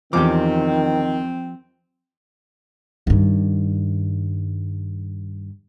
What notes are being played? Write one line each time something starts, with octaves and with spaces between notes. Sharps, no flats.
E2 D#3 F3 C4 G4 D6
G2 D#3